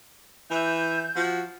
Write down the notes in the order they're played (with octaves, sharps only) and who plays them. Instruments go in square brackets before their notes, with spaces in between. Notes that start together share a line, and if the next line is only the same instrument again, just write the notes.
[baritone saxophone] E3 [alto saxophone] E5 [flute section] G6
[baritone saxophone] F3 [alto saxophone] F#4